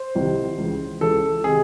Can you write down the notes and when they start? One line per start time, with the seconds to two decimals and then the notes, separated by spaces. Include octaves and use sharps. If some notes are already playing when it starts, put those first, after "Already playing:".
Already playing: C5
0.15 C2 C3 D#3
0.58 C#2 C#3 E3
1.01 C#2 C#3 E3 A4
1.44 C3 D#3 G#4